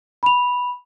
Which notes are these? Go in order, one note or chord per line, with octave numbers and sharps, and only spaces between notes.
B5 F7